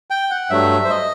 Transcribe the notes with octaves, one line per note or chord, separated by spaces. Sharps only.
G5
F#5
G2 F#3 A3 E5
C5
D#5